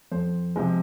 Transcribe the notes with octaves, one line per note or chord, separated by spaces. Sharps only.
F2 C5
C3 F3 G#3